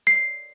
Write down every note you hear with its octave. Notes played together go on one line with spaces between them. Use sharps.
C7